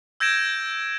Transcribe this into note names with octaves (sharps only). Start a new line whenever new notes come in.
E6 G6 G#6 A#6 D7 E7